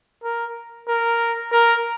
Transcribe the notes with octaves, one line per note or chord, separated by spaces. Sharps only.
A#4
A#4
A#4